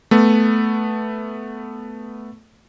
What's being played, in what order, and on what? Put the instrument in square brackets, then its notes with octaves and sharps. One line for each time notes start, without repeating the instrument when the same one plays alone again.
[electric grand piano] A3 B3